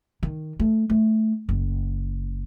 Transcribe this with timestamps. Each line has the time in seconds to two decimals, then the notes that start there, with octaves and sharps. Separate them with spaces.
0.23 D#3
0.60 A3
0.90 A3
1.49 F#1